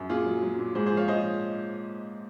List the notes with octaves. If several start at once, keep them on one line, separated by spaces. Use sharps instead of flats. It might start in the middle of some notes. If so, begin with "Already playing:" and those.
Already playing: F#2
A#2 F4 G#4
F#3
F#3
A#2
G#2 G#4 C5
G#4 C5
F3
C#5 F5
F3 C5 D#5